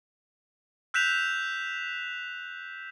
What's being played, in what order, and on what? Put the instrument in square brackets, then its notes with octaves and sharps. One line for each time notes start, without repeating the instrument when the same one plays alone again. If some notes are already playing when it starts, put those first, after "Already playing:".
[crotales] E6 F#6 G6 B6 E7 F7